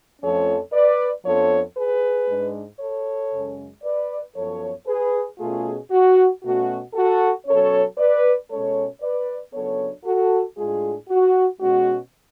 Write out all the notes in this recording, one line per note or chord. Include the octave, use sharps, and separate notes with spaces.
F2 F3 A3 C#4 A4 C#5
B4 D5
F2 F3 B3 D4 A4 C#5
G#4 B4
G#2 G#3 D4
A4 C#5
F#2 C#3 G#3 C#4
B4 D5
F#2 F3 B3 A4 C#5
G#4 B4
B2 A3 C#4 F4 G#4
F#4
B2 A3 C#4 F#4
F#4 A4
B2 F#3 C#4 A4 C#5
B4 D5
B2 G#3 C#4 A4 C#5
B4 D5
C#3 F#3 B3 D4 A4 C#5
F#4 A4
A2 G#3 D4 F4 G#4
F#4
B2 G#3 C#4 F#4